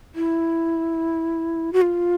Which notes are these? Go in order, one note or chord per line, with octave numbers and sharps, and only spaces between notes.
E4
F#4
F4